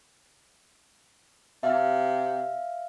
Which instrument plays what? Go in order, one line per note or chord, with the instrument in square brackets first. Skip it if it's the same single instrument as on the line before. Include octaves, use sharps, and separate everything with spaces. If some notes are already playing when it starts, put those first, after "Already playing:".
[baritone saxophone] C3 [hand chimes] E5 F5